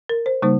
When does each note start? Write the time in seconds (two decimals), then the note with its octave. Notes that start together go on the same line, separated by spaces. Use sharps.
0.09 A#4
0.26 C5
0.42 C#3 G3 A#3 D#4 C5